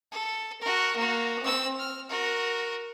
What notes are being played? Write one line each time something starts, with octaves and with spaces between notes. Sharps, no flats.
A4
F#4 A#4
A#3 F#4
C4 E6
F6
F#4 A#4